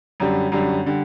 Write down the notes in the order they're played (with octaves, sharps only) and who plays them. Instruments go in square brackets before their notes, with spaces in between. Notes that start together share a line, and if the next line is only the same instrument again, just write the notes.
[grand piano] F#2 D3 G3
F#2 D3 G3
D3 G3